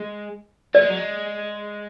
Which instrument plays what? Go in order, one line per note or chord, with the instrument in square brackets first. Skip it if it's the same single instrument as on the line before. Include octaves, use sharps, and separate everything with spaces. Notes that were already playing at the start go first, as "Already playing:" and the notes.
Already playing: [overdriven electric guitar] G#3
[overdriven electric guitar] A3 [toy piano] D5
[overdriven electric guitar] G#3
F#3
G#3